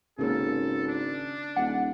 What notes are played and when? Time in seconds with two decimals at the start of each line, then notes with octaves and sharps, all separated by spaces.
0.18 G#1 C#3 A#3 C#4 A4
0.87 D4
1.56 D#1 F#5